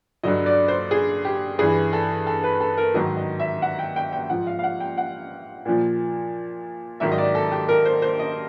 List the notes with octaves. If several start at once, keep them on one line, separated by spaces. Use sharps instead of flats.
G2 D3 F#3 D#5
D5
C5
G#4
G4
G2 E3 G#4
A4
A4
B4
A4
A#4
G#2 D#3 F#3 D#5
D#5
E5
F#5
G5
G5
G5
G#2 F3 F#5
F5
F5
F#5
G5
F#5
A#2 F3
G#2 D#3 F#3 E5
D#5
D5
A4
G4
A#4
C5
C5
D#5